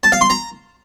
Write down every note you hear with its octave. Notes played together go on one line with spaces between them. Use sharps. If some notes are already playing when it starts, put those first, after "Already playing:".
A5
F5
C6
A#5